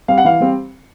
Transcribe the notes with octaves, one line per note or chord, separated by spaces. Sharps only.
G3 C4 F5
F#5
E3 F5
G3 C4